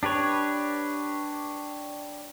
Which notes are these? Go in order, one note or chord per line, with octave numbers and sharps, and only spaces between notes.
D4 G4 B4 C#5